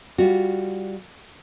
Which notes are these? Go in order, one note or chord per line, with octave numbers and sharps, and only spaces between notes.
G3 F4 F#4